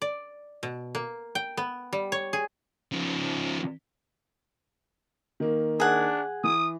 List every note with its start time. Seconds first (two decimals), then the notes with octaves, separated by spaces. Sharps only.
0.02 D5
0.63 B2
0.95 A#3
1.35 G5
1.57 B3
1.93 G3
2.12 C#5
2.33 G#4
2.92 C#3 F3
5.40 D#3 A#3
5.80 D4 G#4 F#5
6.44 E3 D#6